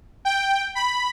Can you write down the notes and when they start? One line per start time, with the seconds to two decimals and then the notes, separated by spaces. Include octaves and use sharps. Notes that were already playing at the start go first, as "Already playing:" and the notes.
0.25 G5
0.75 B5